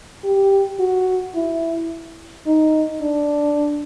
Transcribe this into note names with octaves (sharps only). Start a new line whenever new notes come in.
G4
F#4
E4
D#4
D4